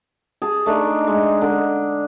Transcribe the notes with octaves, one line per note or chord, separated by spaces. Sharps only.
G#4 A5
A3 D4 D#4
G#3
D3